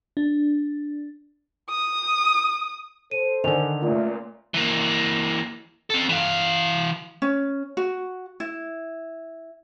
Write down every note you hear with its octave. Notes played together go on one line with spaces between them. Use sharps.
D4
D#6
A4 C5 D#7
D3 D#3 A#4 G#5 F7
C#2 A#2 A3 F4 D5
E3 A#3
C4 A4
E3 F5
C#4
F#4
E4